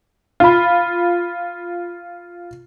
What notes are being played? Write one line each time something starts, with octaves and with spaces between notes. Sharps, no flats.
F4 B5